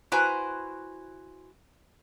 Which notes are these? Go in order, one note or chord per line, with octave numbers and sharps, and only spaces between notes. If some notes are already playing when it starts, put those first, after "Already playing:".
E4 F#4 B4 C5 G#5 A#5